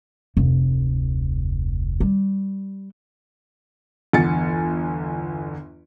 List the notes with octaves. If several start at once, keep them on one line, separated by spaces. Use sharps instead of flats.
F1 D2
G3
G1 E2 G#5 A6 C#7